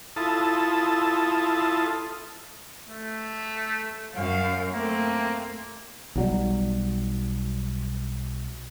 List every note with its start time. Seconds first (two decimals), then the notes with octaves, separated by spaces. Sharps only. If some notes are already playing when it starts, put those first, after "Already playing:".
0.16 E4 F4 A4 A5 D#6
2.88 A3
4.15 F#2 F5
4.73 A3 A#3 C4
6.15 B1 F#3 G3